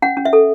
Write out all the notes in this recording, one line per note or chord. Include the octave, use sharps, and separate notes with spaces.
C#4 F#5
C#4
E5
A4